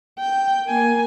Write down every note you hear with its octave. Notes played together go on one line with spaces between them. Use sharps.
G5
A#3 G#5